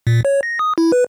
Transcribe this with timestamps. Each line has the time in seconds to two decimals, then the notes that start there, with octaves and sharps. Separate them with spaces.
0.07 A#2
0.25 C#5
0.43 A#6
0.59 D#6
0.78 E4
0.92 B4